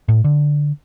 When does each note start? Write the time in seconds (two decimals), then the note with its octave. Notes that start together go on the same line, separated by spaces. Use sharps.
0.08 A2
0.24 D3